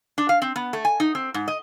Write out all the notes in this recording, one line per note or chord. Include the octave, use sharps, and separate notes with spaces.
D4
F5
C4
B3
A3
G#5
D#4
C4
G#2
D#5